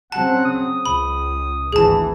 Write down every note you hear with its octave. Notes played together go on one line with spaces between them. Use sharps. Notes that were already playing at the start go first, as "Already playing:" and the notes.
C#3 F#3 C4 F#5 A5
D#6
C#2 B5
G#1 D2 E3 G#4 A5